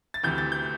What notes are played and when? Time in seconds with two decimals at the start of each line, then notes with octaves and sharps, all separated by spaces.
0.14 A6
0.23 D2 C3 E3 G6
0.38 A6
0.52 G6